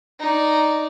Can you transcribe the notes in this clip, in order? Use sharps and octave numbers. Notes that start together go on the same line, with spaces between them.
D#4 D5